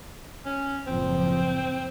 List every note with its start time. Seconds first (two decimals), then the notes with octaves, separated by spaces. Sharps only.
0.46 C#4
0.87 F#1 A2 F3 C4